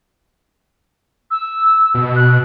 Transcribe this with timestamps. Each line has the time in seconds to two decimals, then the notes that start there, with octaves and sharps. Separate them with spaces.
1.31 E6
1.94 B2
2.16 F#6